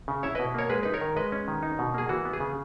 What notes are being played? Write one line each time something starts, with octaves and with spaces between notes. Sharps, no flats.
C#3
E4 C#5 E5
B2 B4 D#5
A#3 A#4 C#5
G#3 G#4 B4
D#4 B4
A#4 C#5
D#3
G#3 B4 D#5
C#4
D#3
D#4
B2
A#3 G#4
E3 F#4
B3
G#4
C#3